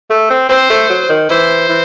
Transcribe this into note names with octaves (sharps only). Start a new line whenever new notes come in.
A3
C4
C4 C5
A3
F#3
D#3
E3 C5
E3